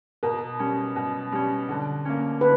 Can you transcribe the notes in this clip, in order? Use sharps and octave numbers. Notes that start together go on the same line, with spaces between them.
B2 A#4
G3 C#4
B2
G3 C#4
D3
A#3 C#4
D3 B4